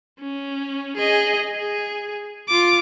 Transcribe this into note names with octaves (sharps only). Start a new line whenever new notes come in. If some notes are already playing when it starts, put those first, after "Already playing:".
C#4
G#4 D#5
G#4
F4 D6